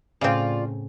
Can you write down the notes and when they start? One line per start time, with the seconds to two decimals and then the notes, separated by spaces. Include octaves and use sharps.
0.21 A2 C#3 C4 F4 D5